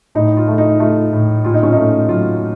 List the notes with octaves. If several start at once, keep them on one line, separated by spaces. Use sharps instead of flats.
A2 D#4
F4
A3
D#4
A3 F4
A2
A#2 F4
D#4
C#4
A3 D#4
F#3 F4